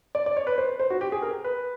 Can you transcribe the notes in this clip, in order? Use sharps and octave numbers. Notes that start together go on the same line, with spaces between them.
D5
D5
C#5
B4
C5
C5
F#4
G4
G#4
A#4
B4